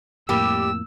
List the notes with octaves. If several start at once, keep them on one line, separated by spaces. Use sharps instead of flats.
F2 A2 G3 A#3 G4 E6